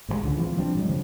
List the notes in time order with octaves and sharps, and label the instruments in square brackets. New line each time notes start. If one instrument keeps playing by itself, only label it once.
[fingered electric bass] A2 F3 G#3
C#2 D3
E3 F3 B3 C4
F3 G3 C4 D4
A#2 F#3 G#3
G2 C#3 F3